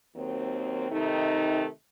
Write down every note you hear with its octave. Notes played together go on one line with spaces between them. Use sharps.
D#2 D#3 F#3 C4
C3 D#3 A3 D#4